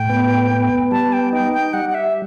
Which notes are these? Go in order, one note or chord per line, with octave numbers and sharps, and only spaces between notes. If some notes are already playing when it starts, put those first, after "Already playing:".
Already playing: A2 G5
B3
B3
G3 A5
G5
D#4 G5
G5
G3 F#5
F#5
E5